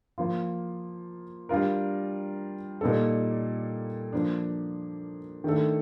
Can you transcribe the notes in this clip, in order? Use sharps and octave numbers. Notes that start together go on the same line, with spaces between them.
F3 A#3 F4
G3 D4 F4 A#4
A#2 G3 A#3 D#4 A4
F3 A#3 D4
D#3 A3 D4 A4